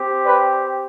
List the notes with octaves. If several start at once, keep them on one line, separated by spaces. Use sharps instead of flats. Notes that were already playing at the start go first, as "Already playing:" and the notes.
Already playing: C4 G4
B4 D5